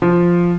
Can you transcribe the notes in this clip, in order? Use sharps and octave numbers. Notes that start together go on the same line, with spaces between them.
F3